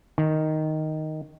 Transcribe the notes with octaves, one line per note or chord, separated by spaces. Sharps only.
D#3